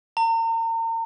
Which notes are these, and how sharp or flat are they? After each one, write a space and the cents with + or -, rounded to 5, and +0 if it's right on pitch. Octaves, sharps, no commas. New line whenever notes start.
A#5 -40